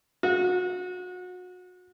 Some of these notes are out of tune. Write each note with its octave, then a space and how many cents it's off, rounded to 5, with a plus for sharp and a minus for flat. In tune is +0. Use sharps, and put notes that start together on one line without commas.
F#4 -30